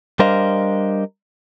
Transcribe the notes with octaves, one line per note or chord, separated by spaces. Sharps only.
G3 D4 A#4 C5 D#5 F5